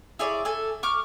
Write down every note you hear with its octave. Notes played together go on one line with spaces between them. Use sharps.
E4 G#4 C#5 D5
A4 G#5
C#6 D6 F6